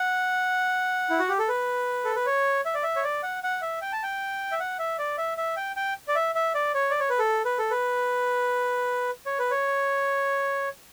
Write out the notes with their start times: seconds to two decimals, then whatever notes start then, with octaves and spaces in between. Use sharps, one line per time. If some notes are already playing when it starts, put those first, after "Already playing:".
Already playing: F#5
1.10 E4
1.19 F#4
1.29 G4
1.39 A4
1.48 B4
2.04 A4
2.15 B4
2.26 C#5
2.65 E5
2.74 D5
2.83 E5
2.96 C#5
3.04 D5
3.23 F#5
3.44 F#5
3.62 E5
3.82 G5
3.93 A5
4.03 G5
4.52 E5
4.60 F#5
4.79 E5
4.99 D5
5.18 E5
5.38 E5
5.56 G5
5.76 G5
6.08 D5
6.15 E5
6.35 E5
6.55 D5
6.74 C#5
6.90 D5
7.00 C#5
7.10 B4
7.19 A4
7.45 B4
7.59 A4
7.71 B4
9.26 C#5
9.39 B4
9.51 C#5